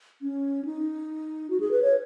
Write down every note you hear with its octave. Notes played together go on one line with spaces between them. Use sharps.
C#4
D#4
F#4
G#4
B4
C#5